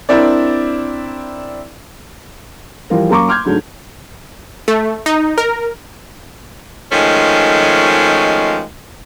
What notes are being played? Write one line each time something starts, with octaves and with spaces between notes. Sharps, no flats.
C4 D4 E4 A#4 D5
E3 F3 G3 F4 A#4
F#2 A#3 A#5 C#6 D6
C6 D6 F6 G6 G#6
G#2 D3 F#3 A3 D4
A3
D#4
A#4
D#3 F3 G#3 A3 C#4